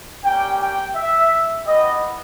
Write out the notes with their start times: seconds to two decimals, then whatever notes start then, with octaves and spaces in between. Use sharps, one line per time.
0.23 G3 A#3 C#4 G4 G5
0.59 G5
0.95 E5
1.66 B3 E4 G4 D#5